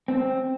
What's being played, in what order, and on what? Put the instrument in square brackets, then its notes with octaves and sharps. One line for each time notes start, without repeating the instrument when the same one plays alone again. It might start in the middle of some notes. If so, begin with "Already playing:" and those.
[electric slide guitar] C4